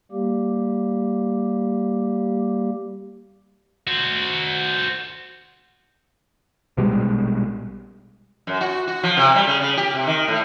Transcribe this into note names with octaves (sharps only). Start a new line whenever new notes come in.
G3 A#3 G4
F#4 C5
A#1 B2 G3 G#3
F#2
F#4
F#4
F3
C3
G3
C#3
C#3
G4
C3
D#3
A2